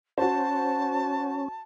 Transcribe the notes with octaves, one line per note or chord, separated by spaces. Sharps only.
C#4 F#4 C5 A5